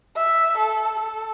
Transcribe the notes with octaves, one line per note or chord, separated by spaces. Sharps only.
E5
A4
A4